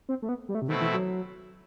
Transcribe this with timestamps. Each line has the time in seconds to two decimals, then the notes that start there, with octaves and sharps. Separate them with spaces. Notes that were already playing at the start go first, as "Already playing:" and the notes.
0.09 C4
0.22 A3
0.29 B3
0.49 G3
0.55 A3
0.62 C3
0.68 B2 D#3 A3 C4 E4
0.81 E3
0.94 F#3